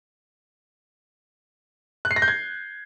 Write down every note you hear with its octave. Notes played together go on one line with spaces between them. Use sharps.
F#6
C7
A#6
G6
G#6